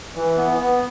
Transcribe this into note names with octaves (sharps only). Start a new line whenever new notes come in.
E3
B3
B3